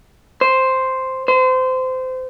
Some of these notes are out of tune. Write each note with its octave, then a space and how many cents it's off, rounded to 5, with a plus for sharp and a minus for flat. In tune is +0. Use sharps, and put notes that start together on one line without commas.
C5 +0
C5 -25